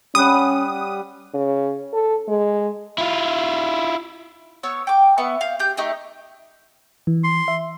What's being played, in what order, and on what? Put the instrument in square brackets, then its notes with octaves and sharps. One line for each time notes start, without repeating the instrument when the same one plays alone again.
[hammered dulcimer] G3 F#5 [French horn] C#4 [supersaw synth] D#6
[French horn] C#3
A4
G#3
[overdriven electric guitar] E4 F4
[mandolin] B3 C#5 E6
G5 D6
B3 E4 C#6
F5 G6
G4 G6
A3 D#4 G4
[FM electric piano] E3
[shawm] C6
[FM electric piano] E5